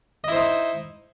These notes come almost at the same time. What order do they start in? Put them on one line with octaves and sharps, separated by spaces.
D#5 E4 C5 D#4